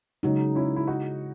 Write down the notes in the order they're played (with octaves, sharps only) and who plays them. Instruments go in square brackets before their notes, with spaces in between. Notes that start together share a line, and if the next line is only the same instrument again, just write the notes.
[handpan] C#3 G#3 D#4 [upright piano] F#3
[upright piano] C#4 E4
E4
D#4 F#4